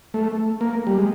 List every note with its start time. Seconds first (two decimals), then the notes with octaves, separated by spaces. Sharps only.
0.14 A3
0.61 A#3
0.87 G3
0.98 G#3